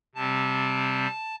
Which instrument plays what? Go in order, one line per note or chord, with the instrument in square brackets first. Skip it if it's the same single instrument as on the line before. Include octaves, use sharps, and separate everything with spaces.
[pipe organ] C3 G3 C4 A5